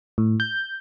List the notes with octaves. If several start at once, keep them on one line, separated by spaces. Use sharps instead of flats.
A2
G6